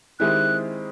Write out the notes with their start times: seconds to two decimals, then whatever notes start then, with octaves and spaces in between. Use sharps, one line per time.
0.19 D#3 G#3 C4 E4 G4 F#6